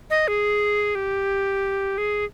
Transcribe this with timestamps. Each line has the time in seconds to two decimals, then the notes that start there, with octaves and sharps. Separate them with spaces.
0.10 D#5
0.28 G#4
0.95 G4
1.98 G#4